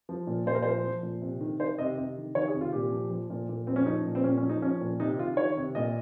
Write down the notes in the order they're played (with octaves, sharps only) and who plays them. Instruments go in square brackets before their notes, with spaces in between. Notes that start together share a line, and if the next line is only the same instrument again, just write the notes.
[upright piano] F3
A#2
A#2 C5
A#4
F3 C5
F3
A#2
C3
D#3
D#3 C5
C3 D#5
C3
D#3
D#3 C#5
G#4
C3
F4
A#2 G4
F3
F3
A#2
A#2
F3 C4
C#4
F3 D#4
A#2
C4
A#2 C#4
C#4
F3
D#4
F3 C#4
A#2
C3 D#4
D#3 F4
D#3 C#5
C3
A#2 D#5